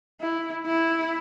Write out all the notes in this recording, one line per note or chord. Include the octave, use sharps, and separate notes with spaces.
E4
E4